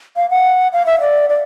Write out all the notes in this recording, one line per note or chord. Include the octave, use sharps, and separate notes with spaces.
F5
F#5
F5
E5
D5
D5